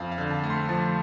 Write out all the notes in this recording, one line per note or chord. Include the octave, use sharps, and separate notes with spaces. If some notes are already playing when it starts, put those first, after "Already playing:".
Already playing: F2 F5
F5
D3
A5
A3
C6
F3 A5